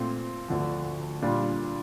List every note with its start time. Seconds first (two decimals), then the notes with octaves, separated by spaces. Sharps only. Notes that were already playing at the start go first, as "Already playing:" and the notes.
Already playing: A#2 A3 C4 F4
0.48 D2 D3 F3
1.22 A#2 G3 D4 F4